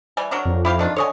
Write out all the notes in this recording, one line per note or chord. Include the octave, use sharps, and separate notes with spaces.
E3 G3 G#5
F#3 D4 A#4
F2
E4 G4 F5
D#3 D4 F4
D3 C#5 D#5 G#5